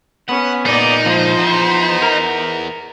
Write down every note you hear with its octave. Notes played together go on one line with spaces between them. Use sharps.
B3 C#4 F#5
A#2 G#3 A#3 D#4 D5
F3 C5 C6
E2 B3
A#4